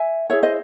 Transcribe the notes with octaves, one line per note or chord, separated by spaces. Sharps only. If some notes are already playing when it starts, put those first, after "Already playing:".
Already playing: E5 G#5
E4 G#4 C#5 E5
C5 D#5